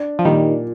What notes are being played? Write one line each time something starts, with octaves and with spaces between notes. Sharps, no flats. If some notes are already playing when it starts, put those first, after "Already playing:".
Already playing: D4
F3
A#2 D#3 G3